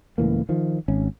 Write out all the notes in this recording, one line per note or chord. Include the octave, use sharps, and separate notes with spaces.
C#2 A2 E3 A#3
D#3 F3
G#1 C#4